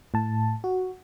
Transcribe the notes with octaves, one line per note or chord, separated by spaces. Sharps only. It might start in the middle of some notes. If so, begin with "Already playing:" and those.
A2 A5
F#4